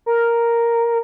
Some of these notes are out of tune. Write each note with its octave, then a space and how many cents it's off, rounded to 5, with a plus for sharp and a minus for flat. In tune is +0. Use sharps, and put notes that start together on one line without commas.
A#4 +0